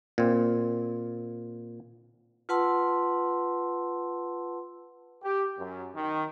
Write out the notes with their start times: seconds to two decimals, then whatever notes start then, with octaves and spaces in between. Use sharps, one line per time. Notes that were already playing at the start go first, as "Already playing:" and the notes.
0.18 A#2 C4
2.49 F4 B4 F#5 A5 C6 E6
5.24 G4
5.59 F#2
5.96 D#3